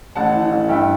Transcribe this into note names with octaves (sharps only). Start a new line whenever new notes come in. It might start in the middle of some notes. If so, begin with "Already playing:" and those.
A1 F#5 A5
E3
A1
G2 E5 G5